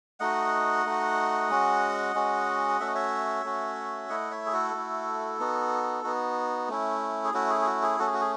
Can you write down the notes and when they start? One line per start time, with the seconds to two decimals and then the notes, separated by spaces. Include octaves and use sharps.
0.20 A3 D#4 F#4 D#5 F#5
0.86 A3 D#4 F#4
1.50 G#3 C#4 F#4
2.15 G#3 C#4 F#4
2.80 A3 C#4 F#4 E5
2.87 D#5
2.95 C#5 E5
3.44 A3 C#4 F#4
4.09 A3 E4 D#5 F#5
4.31 C#5 E5
4.46 G#4
4.53 F#4 A4
4.74 A3 E4
5.39 B3 D#4 F#4
6.04 B3 D#4 F#4
6.68 A3 C#4 E4
7.24 G#4
7.34 A3 C#4 E4 F#4
7.50 G#4
7.61 G#4
7.67 F#4
7.82 G#4
7.99 A3 C#4 F#4 A4
8.07 G#4
8.14 F#4
8.21 G#4